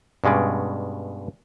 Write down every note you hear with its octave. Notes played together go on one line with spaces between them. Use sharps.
G2 B2 G#3 C#4 D5